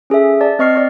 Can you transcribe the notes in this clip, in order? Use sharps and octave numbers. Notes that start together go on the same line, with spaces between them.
C#4 G#4 A4 E5
D5 A5
C4 D#5 C#6 F6 C7
D5 C#6